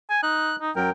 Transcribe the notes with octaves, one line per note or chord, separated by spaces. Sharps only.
G#5
D#4 F#6
D#4
F#2 F#3 A#4 G5